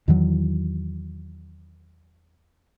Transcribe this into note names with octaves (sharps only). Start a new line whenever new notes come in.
E2 D#3 E3 F#3